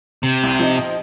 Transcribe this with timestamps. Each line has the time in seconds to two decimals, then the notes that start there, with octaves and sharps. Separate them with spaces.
0.23 C3
0.43 C2
0.59 F3 C4 D#4